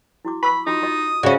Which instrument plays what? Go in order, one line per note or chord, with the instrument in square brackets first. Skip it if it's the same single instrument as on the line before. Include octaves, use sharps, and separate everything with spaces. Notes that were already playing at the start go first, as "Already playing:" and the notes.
[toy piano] E4 F#4 D6
[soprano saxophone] B5 [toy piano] C#6 E6
[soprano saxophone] D#4 [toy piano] F4 F#4 B5 [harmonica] D#6
[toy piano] F4 F#4 D#5
[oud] C#3 C#4 [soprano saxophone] F#4 [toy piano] D5 E5 F5